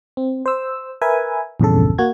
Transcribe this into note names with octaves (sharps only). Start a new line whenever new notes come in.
C4
C5 E6
A#4 B4 E5 G#5
A#1 E2 G2 C#3 A4
A#3 F#4 G#6